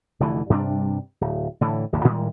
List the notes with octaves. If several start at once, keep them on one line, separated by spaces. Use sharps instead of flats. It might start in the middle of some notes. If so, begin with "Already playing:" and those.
F1 D3 E3 A3
G2 C3 G3 D4
D1
A2 D3 E3
F1 D2 A2 D#3
A2 D#3 G3 G#3